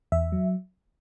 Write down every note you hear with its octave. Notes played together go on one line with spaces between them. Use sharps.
E2 E5
F#3